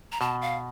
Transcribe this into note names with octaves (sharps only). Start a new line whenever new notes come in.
A#5
B2 A5
F5